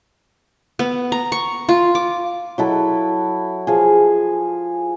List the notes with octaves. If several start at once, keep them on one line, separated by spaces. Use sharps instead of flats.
B3
A#5
C#6
F4
D6
F#3 E4 A4
F3 G#4